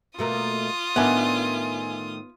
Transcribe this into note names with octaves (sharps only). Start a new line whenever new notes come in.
B2 A3 A#3 F4 D#6
A2 D#3 B3 D4 E5 G#5